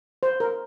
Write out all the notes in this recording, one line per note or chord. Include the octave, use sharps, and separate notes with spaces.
C5
A#4